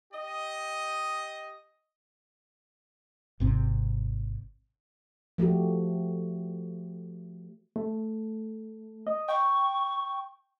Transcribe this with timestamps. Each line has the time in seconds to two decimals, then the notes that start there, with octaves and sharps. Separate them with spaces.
0.13 G4 D#5
3.40 G#1 C3 C4
5.38 F3 A3 F#4 G4
7.76 A3
9.07 D#5
9.28 G5 C#6